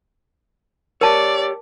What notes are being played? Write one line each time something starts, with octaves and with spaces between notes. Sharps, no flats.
G4 A#4 C#5 D5 A5